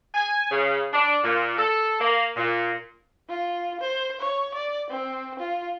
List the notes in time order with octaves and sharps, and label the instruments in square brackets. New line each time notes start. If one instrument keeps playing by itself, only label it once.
[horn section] G#5
C#3
D4
A#2
A4
A#3
A#2
[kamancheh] F4
C5
C#5
D5
C4
F4